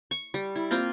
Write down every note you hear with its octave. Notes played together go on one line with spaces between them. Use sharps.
C#6
G3
E4
A#3 C4 F4 A#5